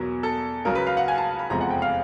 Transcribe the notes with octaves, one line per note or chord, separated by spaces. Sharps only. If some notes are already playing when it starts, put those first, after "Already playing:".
Already playing: E2 B2 F#3 A#4
A4
C#2 C#3 F#3 A#4
B4
F5
F#5
G#5
A5
B5
F1 E2 C3 F3 G#3 A#5
F#5
G5
F5